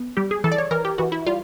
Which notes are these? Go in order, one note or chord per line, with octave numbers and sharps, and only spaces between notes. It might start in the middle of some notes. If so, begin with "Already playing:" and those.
Already playing: B3
G3 G4
G#4
E3 A4
D5
C#5
E3 A#4
G4
E3 F#4
E4
G3 F4